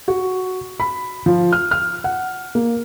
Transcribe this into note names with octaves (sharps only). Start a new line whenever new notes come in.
F#4
B5
F3
F6
F6
F#5
A#3